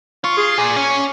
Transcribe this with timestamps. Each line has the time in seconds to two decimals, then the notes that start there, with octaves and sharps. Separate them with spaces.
0.24 F4 C#6
0.37 G#4
0.58 A#2 G#5
0.77 C#4